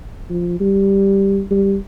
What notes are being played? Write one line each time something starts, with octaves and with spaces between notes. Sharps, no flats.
F3
G3
G3